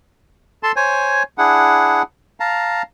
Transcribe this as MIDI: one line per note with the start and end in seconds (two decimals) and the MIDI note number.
0.63 0.72 69
0.63 0.72 81
0.63 0.72 84
0.76 1.23 72
0.76 1.23 73
0.76 1.23 80
1.38 2.02 62
1.38 2.02 64
1.38 2.02 68
1.38 2.02 78
2.40 2.82 77
2.40 2.82 81
2.40 2.82 82